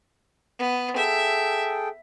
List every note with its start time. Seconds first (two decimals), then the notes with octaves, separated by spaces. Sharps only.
0.59 B3
0.97 G#4 A4 E5 G5